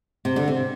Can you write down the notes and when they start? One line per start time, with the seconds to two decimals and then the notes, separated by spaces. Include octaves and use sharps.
0.25 C3
0.36 D3
0.48 C3